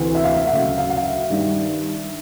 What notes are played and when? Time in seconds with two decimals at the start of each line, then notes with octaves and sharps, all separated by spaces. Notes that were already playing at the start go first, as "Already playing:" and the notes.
Already playing: D2 C3 E3
0.15 E5
0.24 F5
0.34 E5
0.48 F#5
0.53 D2 C#3 F#3 F5
0.78 F5
0.90 F#5
0.96 F5
1.04 E5
1.30 G2 D#3 G3